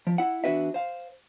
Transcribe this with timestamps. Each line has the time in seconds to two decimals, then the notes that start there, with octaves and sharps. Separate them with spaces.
0.07 F3
0.18 E4 F#5
0.44 E2 D4 F#4 B4 E5
0.74 C5 F5